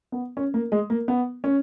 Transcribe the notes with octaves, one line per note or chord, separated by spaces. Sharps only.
B3
C#4
A#3
G#3
A#3
B3
C#4